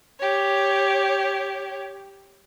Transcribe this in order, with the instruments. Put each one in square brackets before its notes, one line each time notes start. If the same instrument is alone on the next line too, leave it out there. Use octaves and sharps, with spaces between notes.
[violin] G4 C#5